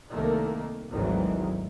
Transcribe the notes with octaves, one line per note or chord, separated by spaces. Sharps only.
C2 D#3 A3 A#3
G#1 D2 G#2 D#3 E3 F#3